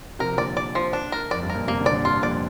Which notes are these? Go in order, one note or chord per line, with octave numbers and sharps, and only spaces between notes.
C3 F3 A#4
A#2 D3 D5
D5
F3
D4
A#4
F2 D5
G2
A#4
F2 A#2
G2 C3 A#3
A#2 D3
D5
A#2 D3
G2 C3 F4
F2 A#2 D5